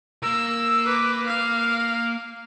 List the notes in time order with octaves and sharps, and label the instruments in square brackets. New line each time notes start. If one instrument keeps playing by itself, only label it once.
[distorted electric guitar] A#3 A#4 [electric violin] E6
[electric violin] B4 D6
F5